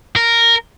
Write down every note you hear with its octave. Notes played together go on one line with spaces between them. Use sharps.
A#4